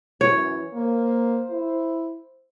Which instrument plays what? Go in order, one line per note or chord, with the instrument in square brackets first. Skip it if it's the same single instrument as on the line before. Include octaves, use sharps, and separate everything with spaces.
[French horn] F#2 [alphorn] E3 [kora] C#5
[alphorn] A#3 [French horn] C5
[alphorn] E4